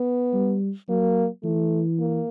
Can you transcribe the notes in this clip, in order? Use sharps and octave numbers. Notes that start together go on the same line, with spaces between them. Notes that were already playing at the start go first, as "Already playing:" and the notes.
Already playing: B3
G3
F#3 A#3
E3 A3
A#3